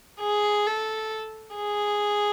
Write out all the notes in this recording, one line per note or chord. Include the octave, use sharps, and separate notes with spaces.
G#4
A4
G#4